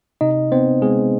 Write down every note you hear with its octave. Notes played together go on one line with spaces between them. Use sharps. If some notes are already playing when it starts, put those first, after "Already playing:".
C3 D#4 D#5
B3 C4 C5
G#3 B3 G#4